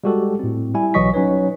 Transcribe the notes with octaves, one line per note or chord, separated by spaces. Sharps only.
G3 G#3 F#4 G4 A4
A2 C4
G3 E4 G#5
B1 E3 F#3 D#5 C#6 B6
F#3 C#4 D#4 B4 C#5